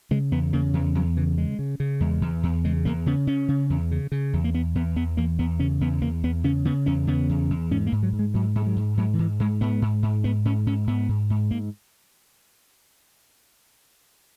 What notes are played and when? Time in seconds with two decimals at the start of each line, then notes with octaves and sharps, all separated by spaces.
0.11 C#3 G#3
0.32 E2 B3
0.53 C#3 A#3
0.74 E2 E3
0.95 E2 F#3
1.16 C#3 E3
1.37 C#3 G#3
1.59 C#3
1.80 C#3
2.00 E2 G#3
2.22 E2
2.43 E2
2.64 C#3 G#3
2.85 E2 A#3
3.06 C#3 B3
3.27 C#3 C#4
3.48 C#3
3.70 E2
3.91 C#3
4.12 C#3
4.33 E2
4.44 A#3
4.54 E2 B3
4.75 E2 B3
4.96 E2 B3
5.17 E2 A#3
5.39 E2 B3
5.60 C#3 C#4
5.81 E2 B3
6.02 E2 A#3
6.24 E2 B3
6.44 C#3 C#4
6.65 C#3 B3
6.86 E2 C#4
7.07 C#3 B3
7.29 E2
7.50 E2
7.71 G#2 C#4
7.87 A#3
7.92 G#2
8.03 F#3
8.13 G#2
8.19 G#3
8.34 G#2 F#3
8.55 G#2 G#3
8.67 F#3
8.76 G#2
8.97 G#2 F#3
9.13 D#3
9.19 G#2 E3
9.40 G#2 G#3
9.61 G#2 B3
9.82 G#2
10.03 G#2
10.24 G#2 B3
10.45 G#2 C#4
10.67 G#2 C#4
10.87 G#2 B3
11.09 G#2
11.30 G#2
11.51 G#2 A#3